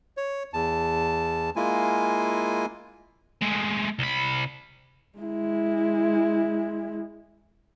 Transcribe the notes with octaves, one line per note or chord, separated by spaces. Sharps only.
C#5
E2 A5
G#3 A#3 E4 F4 G#5
G#3 A3
C2 B5
G#3 E4